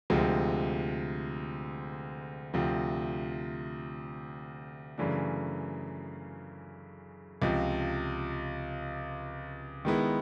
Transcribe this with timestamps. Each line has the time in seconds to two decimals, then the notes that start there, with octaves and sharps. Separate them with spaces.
0.10 D2 C3 F3 G#3
2.54 D2 C3 F3
4.98 F#2 C#3 E3 A3 D4
7.42 C#2 C3 F3
9.85 D#3 G#3 B3 E4